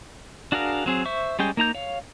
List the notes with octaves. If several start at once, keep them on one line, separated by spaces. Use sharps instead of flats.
D4 F#4 G#4 A#4 F5
F#3 C4 G#4
C5 E5 C#6
G3 G#3 C#4 G#4 G5
A#3 D#4 A#5 G6
C#5 F5